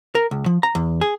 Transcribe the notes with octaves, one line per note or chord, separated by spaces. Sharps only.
A#4
C#2
F3
A#5
E2
G#4